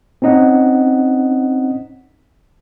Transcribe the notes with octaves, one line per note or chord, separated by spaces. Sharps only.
C4 C#4 D#4 D#5 F#5